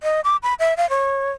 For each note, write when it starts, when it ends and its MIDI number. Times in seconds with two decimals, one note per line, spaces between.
0.03 0.21 75
0.24 0.37 86
0.43 0.54 83
0.59 0.74 76
0.77 0.89 77
0.90 1.31 73